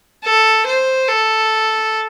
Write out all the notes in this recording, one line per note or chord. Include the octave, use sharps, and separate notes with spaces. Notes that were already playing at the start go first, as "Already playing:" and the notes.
A4
C5
A4